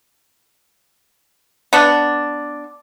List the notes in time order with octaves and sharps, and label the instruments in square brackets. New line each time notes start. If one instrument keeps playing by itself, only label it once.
[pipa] B3 D4